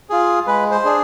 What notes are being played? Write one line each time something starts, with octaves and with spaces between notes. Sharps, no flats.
F4 G#4
G#3 B4
C5
D4 G#4